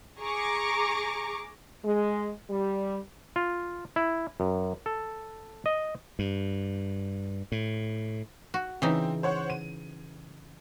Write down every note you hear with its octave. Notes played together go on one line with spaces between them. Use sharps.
G#4 A#5 C#6 D6
G#3
G3
F4
E4
F#2
A4
D#5
G2
A2
F#4
C#3 E3 C4 D#4
C5 C#5 F#5
D#7